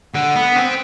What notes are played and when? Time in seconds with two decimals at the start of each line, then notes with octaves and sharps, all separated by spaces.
0.14 D3 F#5
0.36 B3
0.56 C4